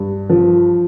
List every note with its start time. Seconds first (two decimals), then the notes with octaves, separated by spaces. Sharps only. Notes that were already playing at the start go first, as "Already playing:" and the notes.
Already playing: G2
0.29 F3